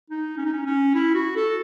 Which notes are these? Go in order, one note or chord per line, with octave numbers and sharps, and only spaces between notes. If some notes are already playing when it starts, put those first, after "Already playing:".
D#4
C#4
D#4
C#4
C#4
E4
F#4
A4